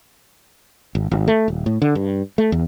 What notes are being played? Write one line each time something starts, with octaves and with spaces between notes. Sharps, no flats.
G#1
G#1
A3
D#1
A2
D3
G2
A3
E2